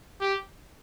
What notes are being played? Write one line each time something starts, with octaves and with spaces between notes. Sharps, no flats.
G4